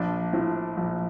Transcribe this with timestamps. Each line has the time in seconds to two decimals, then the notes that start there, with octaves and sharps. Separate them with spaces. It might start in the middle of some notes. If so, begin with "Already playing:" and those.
Already playing: A#1 D4
0.33 A2 F3
0.77 A#1